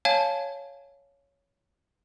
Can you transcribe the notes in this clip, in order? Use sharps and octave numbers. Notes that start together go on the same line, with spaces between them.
C#5 F5 G#5 A5 G#6